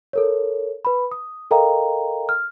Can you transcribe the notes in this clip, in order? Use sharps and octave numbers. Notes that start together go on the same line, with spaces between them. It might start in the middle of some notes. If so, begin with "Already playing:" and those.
A4 A#4 C#5
B4 B5
D#6
A4 A#4 D#5 F5 G5 A#5
F6